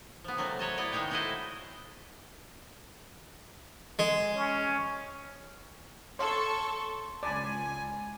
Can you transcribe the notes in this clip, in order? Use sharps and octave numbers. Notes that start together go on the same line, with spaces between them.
F3 B3
C3 F#3 A3 A#3
B4 C#5 D#5 A5
B3 E4 D5 D#5
D#3 G#3 A#3 D#4 C#5 G5
D#4 E4 F#4 A4 C5 D#5
G#3
C#4
A4 C#5 F5 A5 C6 C#6
C#2 D5 G#5 A5 B5